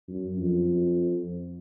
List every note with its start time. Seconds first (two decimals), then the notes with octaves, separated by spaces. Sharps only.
0.08 F#2
0.37 F2